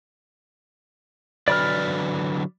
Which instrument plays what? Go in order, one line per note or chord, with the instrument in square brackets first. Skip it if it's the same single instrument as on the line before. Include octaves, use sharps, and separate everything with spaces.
[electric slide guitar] D3 F#3 B4 [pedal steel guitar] D5 B5 F6